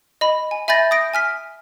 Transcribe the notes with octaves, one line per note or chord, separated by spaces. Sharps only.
D#5 B5
G#5
E5 G#5 B5 G6 A6 A#6
D#6 G6 A#6 D7
G#5 F6 B6